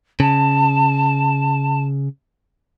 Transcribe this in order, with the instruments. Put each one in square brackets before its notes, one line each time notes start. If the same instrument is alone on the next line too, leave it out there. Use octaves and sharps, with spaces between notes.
[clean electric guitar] C#3 [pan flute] A5